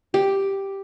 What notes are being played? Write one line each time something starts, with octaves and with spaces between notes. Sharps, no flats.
G4